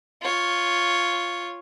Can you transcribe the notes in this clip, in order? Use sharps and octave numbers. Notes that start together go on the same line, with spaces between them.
F4 C#5